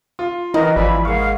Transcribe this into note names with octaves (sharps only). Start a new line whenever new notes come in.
F4
D#3 E3 E4 A#4 B4 D#5
G#1 E3 F3 E4 F4 D5 B5
G#2 A#3 G#4 F5 C#6